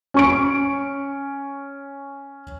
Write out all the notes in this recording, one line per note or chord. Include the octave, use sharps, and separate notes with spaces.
C#4 C#6 D7